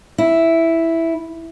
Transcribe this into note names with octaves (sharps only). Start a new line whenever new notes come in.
E4